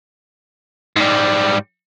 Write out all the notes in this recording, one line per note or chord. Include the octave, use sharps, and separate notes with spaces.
G#2 G3